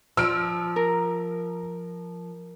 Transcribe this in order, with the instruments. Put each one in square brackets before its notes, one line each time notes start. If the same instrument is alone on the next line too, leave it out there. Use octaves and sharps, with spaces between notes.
[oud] F3 [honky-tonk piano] E6 F6 D7
[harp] A#4